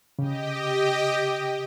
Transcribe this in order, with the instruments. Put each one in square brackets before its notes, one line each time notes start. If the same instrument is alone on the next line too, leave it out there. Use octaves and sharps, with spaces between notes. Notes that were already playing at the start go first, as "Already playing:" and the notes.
[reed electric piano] C#3 [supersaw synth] G4 D#5 G5